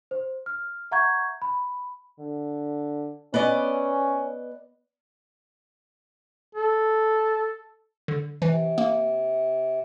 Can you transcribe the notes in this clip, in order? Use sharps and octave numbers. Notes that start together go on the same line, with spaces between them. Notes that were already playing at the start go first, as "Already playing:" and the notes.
C5
F6
E5 F#5 A#5 C#6 G6 G#6
B5
D3
B3 C#4 D5 D#5
A4
D3
C3 E3
A#3